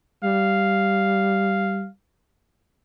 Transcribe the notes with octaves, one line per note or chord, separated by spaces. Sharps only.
G3 F5